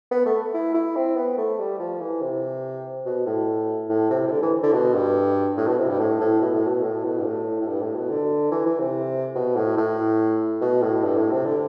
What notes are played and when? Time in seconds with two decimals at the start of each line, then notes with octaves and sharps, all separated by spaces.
0.11 B3
0.26 A3
0.54 E4
0.74 E4
0.96 C4
1.16 B3
1.38 A3
1.59 G3
1.79 F3
2.00 E3
2.22 C3
3.06 B2
3.26 A2
3.89 A2
4.10 C3
4.28 C3
4.31 D3
4.42 E3
4.63 D3
4.73 B2
4.95 G2
5.57 A2
5.68 B2
5.78 C3
5.89 G2
5.99 A2
6.20 A2
6.41 B2
6.54 A2
6.67 B2
6.83 A2
7.04 B2
7.19 G2
7.25 A2
7.61 A2
7.68 G2
7.82 A2
7.96 B2
8.09 D3
8.52 E3
8.66 E3
8.79 C3
9.35 B2
9.56 A2
9.77 A2
10.61 B2
10.83 A2
11.04 G2
11.17 A2
11.31 C3
11.45 D3